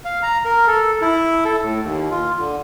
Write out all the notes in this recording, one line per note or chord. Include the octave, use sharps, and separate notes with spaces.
F5
A#5
A#4
A4
E4
A4
A2
D#2
F4
D3